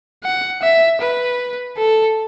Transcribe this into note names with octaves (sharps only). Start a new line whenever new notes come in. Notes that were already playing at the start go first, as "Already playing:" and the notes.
F#5
E5
B4
A4